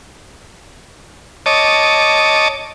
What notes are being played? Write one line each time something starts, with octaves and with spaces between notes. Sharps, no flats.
C#5 D#5 A5 D6